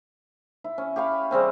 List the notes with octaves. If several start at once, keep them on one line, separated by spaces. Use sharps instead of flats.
E4
C#4
G4 C#5 F5 B5
C#3 G3 C4 C#4